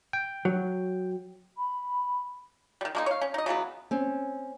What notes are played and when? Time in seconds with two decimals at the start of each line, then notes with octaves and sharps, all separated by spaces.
0.13 G5
0.45 F#3
1.57 B5
2.81 D#3 G3
2.95 G#3 A#3 D#4
3.06 C#5 F5
3.21 C#4
3.34 D#4 D#5
3.46 C#3 E3 F#3 B3
3.91 C4 C#4